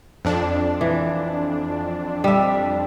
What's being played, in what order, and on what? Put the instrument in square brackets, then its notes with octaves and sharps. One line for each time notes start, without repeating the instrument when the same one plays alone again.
[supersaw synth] F2 D4
[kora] E3
G3 E5